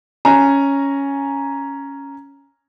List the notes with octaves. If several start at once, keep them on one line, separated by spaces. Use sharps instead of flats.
C#4 G#5 A#5